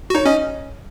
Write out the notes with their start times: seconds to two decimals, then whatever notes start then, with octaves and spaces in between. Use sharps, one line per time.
0.10 F#4
0.15 D#4 C#5
0.26 C#4 D#5